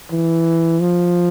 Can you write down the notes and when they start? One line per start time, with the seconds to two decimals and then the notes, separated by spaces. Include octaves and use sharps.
0.12 E3
0.81 F3